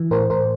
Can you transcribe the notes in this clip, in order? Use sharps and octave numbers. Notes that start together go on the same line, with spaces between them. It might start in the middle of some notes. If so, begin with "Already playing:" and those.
Already playing: E3
A2 A#4 C5
A2 A#4 C5